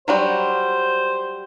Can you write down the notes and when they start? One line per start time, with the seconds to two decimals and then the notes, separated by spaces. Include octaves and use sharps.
0.08 F#3 G3 F#4 C5